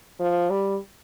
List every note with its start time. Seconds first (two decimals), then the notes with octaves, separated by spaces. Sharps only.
0.20 F3
0.50 G3